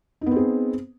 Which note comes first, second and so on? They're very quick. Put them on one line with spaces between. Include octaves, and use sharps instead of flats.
D#4 B3 C4 G#4